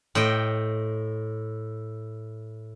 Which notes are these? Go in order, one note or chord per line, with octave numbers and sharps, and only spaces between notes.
A2 C5 D#5 G5